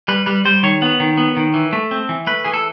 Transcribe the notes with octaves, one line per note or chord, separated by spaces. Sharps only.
G3 B4
G3 B4
G3 C5
D#3 C#5
B3
D#3
B3
D#3
E3
A3
C4
E3
A3 B4
E3 G#4
A4